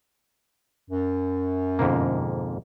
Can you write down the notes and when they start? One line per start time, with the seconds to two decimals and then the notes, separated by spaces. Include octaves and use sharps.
0.89 F#2
1.79 F2 G#2 B2 D3 A#3 C4